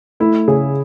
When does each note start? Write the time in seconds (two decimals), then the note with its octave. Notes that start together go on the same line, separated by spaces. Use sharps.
0.20 A3 E4
0.48 C#3 G#4